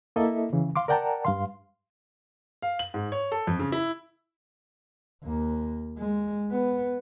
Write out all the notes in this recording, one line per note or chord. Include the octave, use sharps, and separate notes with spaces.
A#3 E4 A4 D#5 E5
C#3 E3
F5 C6 D6
A#4 D5 F#5 G5 A5 A#5
G2 F5 C6
F5
F#7
G#2
C#5
A4
F2
C#3
E4
D#2 A#3
G#3
B3